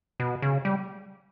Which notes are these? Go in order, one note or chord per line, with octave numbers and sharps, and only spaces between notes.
B2
C#3
G3